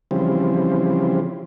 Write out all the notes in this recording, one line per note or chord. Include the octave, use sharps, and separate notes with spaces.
C#3 E3 F3 G3 C4